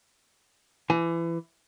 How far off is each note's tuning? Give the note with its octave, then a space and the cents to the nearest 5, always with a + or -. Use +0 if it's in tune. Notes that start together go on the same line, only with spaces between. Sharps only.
E3 +25 G#5 +25